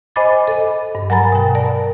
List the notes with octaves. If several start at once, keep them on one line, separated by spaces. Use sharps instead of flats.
C5 D#5 G#5 B5 D6 A6
A4 D#5
G2
F#3 A#4 G#5 A#5 B5 A6
B2 G5
A#4 D5 A5